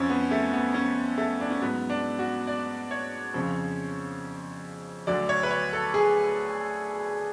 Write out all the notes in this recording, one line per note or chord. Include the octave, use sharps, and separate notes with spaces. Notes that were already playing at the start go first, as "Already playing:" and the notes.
Already playing: F2 F3 C#4
B3
A3
B3
C#4
A3
D4
C#4
G#2 F#3 B3
D4
F#4
D5
C#5
F2 C#3 F3
D2 D3 F#3 D5
C#5
B4
C#5
A4
G#4